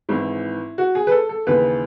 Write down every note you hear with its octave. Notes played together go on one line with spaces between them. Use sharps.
G#1 G#2 E3 E4
F#4
G#4
B4
A4
A4
D#2 C#3 E3 B4